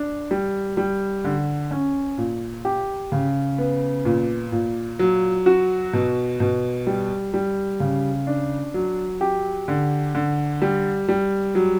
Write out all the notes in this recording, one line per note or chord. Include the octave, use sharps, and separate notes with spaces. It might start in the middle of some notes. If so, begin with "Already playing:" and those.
Already playing: D4
G3
G3
D3
C#4
A#2
G4
C#3
B3
A#2
A#2
F#3
F#4
B2
B2
G3
G3
C#3
D4
F#3
G4
D3
D3
G3
G3
F#3